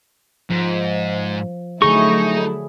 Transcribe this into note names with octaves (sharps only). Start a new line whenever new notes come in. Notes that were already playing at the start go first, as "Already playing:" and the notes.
G#2 F3
D3 F#3 A3 D#4 E4 G#4 C#6